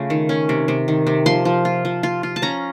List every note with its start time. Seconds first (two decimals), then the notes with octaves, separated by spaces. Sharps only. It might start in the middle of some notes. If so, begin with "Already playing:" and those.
Already playing: C#3 A3 F4
0.10 D#3
0.29 C#4
0.49 C3
0.68 C3
0.88 D#3
1.07 C3
1.26 F3 C6
1.45 F3
1.65 F4
1.85 F3
2.03 F4
2.23 F4
2.36 A5
2.42 C#4 A#5